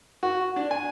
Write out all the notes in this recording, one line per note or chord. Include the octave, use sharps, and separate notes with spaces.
F#4
D4
G#5